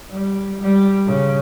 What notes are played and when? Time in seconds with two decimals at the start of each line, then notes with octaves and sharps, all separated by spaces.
0.11 G3
0.61 G3
1.07 C#3